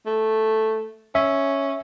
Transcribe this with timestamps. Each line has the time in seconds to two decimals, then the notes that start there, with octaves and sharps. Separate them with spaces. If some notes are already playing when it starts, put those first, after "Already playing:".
0.06 A3
1.15 C#4 E5